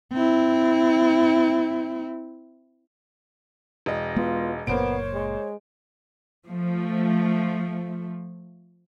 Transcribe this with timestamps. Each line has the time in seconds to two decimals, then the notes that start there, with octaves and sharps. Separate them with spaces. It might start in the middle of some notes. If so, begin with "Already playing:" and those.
0.12 C4 E4
3.86 E1 D#5
4.16 G#3 B3 F4 B4
4.67 F#1 A#2 A#3 B3 C5 C#5 D7
5.14 G#3
6.47 F3 A3